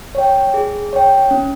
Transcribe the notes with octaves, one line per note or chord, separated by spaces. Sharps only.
C#5 G5
G#4
C#5 G5
C#4